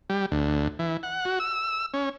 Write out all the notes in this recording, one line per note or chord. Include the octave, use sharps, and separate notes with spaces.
G3
D2
E3
F#5
F#4
E6
C#4